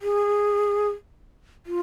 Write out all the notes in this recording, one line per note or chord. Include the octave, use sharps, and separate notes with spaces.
G#4
F4